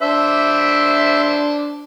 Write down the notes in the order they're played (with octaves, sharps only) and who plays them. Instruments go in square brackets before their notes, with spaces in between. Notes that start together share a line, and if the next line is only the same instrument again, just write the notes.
[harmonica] D4 C5 [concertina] E5